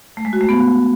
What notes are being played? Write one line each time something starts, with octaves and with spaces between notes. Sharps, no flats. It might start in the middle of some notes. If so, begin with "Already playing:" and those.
A3
G#3
F#4
A3
B3